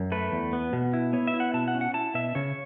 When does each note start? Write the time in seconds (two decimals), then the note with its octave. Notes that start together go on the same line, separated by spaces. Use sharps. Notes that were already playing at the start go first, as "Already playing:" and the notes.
Already playing: F#2
0.12 A3 B4
0.32 E2
0.53 B3
0.73 B2
0.93 E4
1.13 B3 C#5
1.27 E5
1.34 E4
1.40 F#5
1.54 B2 A5
1.68 F#5
1.75 C#4
1.81 F#5
1.94 E4 A5
2.14 B2 E5
2.35 C#3 C#5